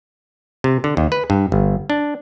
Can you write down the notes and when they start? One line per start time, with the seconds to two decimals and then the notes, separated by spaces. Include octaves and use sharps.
0.64 C3
0.84 D3
0.97 D#2
1.12 B4
1.30 G2
1.52 G1
1.90 D4